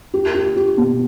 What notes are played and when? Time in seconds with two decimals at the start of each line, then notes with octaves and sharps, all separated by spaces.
0.14 G4
0.35 G4
0.56 G4
0.77 B2